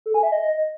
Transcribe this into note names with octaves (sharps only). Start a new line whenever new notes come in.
A4
G#5
E5
D#5